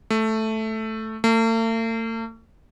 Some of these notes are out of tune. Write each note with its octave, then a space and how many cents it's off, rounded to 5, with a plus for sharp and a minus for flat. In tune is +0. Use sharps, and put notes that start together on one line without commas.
A3 +0
A3 +45